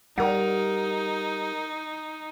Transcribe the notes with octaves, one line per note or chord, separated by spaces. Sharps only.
G3 D#4 A#4 F#5